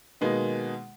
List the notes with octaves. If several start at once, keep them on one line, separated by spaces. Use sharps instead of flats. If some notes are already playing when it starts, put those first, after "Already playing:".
B2 D#3 G#3 A#3 B3